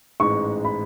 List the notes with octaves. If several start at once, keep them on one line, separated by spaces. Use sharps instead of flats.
A1 G#2 G#3 C#6
B5